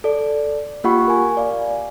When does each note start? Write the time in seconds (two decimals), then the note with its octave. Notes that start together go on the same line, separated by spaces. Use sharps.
0.04 A4 D5
0.84 A#3 F4 G4 F#5 B5 C#6
1.08 A#4 G#5
1.37 D5 F5